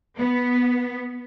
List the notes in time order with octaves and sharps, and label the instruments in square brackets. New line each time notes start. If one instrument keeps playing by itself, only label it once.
[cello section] B3